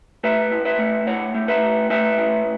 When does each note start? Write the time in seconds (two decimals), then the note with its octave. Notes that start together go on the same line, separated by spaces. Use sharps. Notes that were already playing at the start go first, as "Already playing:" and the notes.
0.24 A3 B4 E5
0.52 A2
0.65 B4 E5
0.79 A3
1.07 A2 C#5 F#5
1.34 A3
1.48 B4 E5
1.62 A2
1.90 A3 B4 E5
2.18 A2